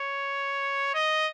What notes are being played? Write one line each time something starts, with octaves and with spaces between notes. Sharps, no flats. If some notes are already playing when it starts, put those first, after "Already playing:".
Already playing: C#5
D#5